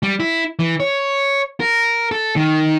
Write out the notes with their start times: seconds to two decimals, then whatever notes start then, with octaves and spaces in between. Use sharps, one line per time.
0.03 G3
0.20 E4
0.59 E3
0.80 C#5
1.60 A#4
2.11 A4
2.36 D#3